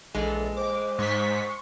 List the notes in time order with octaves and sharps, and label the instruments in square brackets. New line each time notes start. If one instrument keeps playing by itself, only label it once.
[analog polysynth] A#1 E3 A4 [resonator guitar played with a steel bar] G#3
[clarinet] C5 [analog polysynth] D6
[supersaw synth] G#2 B6 [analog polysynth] C6 C#6